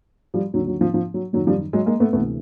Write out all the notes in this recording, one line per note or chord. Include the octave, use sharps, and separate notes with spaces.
F3 G3
D#2 D3 F#3
F#3
F3
F3
F#3
F#2 D#3 F#3
F3 G3
F#3 G#3
G#3 A#3
A3 B3
D2 C3 E3 A3 B3